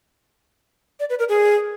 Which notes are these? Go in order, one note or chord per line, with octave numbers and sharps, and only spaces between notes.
D5
B4
A#4
G#4